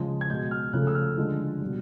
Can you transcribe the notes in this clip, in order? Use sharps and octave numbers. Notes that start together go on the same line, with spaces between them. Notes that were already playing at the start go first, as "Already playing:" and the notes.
Already playing: C#3 F3 G#3
G#6
B2 G#3 G6
F6
C#3 F3 A3 F#6
E6
F6
D3 F3 G#3
B2 G3